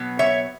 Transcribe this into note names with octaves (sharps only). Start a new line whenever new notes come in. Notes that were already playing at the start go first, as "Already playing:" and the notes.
Already playing: B2 F#3 B3
C#5 E5